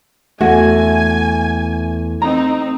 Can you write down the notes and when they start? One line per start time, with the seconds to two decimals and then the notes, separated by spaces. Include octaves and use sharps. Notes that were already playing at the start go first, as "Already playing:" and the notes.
0.41 E2 A3 F#4 G#5
2.22 C4 D#4 A#5